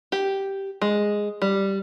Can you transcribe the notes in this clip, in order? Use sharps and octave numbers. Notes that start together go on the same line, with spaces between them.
G4
G#3
G3